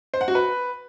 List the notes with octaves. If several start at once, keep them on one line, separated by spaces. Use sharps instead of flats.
C5
F#5
F#4
B4